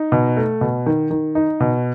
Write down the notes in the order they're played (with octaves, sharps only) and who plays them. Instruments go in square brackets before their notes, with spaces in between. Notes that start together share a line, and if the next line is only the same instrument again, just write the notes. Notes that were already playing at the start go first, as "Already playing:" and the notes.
Already playing: [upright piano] D#4
B2
A3
B2
D#3
D#3
D#4
B2